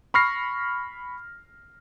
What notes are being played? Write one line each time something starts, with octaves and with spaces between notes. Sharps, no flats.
B5 C#6 F6 A#6 C7